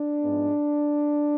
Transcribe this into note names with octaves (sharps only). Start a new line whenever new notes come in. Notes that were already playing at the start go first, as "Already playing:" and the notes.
Already playing: D4
G#2 F3 G#3 B3